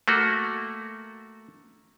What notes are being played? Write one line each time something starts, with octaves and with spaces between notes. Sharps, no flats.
A3 A#3 F#4